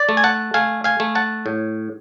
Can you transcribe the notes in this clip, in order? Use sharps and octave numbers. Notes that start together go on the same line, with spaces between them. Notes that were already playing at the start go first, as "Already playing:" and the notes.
Already playing: D5
A3
G#5
F#5 A5
A3 F5 G#5
F5 G#5
A3
F#5 A5
A2